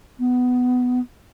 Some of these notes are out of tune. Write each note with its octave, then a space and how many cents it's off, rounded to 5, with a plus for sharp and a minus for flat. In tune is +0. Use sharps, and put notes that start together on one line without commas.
B3 +10